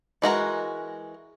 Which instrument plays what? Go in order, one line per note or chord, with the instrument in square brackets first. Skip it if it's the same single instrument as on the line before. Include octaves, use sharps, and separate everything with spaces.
[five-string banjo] E3 G#3 F#4 A#4